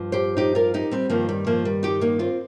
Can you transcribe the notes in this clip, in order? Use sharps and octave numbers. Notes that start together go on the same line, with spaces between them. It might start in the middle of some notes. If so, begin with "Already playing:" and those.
Already playing: G2 F3
G4 C5
D#4 G4
F4 A#4
D#4 G4
G3 C4
G2 D#3 F3 A#3
G3
F3 A#3
G3
D#4 G4
A#3 D#4
C4 F4